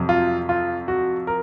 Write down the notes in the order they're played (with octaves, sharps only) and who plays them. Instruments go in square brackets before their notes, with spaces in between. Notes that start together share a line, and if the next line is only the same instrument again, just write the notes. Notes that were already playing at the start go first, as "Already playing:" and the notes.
Already playing: [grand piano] F2 C3 F#3
F4
F4
F#4
A#4